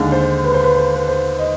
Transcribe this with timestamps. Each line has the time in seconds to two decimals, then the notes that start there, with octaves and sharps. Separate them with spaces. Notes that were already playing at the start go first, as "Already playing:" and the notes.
Already playing: D#2 D3 G#3 D4 F5
0.12 C5
0.44 B4
0.54 C5
0.64 B4
0.75 C5
0.95 B4
1.08 C5
1.39 D#5